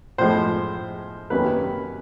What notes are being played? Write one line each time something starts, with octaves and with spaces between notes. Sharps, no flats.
A2 F3 G#3 C5
C3 D#3 F#3 A#3 C#4 B4